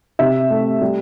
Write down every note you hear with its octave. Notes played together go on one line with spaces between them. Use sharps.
C3 E5
A3
G3